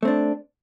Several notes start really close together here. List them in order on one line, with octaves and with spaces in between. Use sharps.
A3 C4 D4